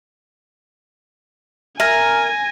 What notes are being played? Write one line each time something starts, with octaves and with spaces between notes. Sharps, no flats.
A#4 E5 G#5 G#6 A#6 D#7